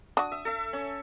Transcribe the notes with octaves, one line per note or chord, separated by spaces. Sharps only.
D4 F#4 D#6
E5
A4 E5
C#4